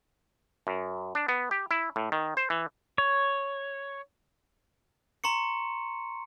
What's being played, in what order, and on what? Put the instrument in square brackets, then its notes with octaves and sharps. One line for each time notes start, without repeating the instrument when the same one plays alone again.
[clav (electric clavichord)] F#2
D4
B3
G4
E4
A2
D#3
C5
E3
[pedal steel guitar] C#5
[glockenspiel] A#5 C6 C#6 C#7